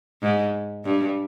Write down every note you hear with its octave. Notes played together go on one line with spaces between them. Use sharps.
G#2
G2